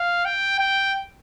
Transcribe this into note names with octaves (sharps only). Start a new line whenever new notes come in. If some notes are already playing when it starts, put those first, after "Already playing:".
Already playing: F5
G5
G5